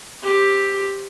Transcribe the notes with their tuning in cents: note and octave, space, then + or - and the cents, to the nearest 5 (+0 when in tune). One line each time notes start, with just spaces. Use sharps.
C4 +10 G4 +5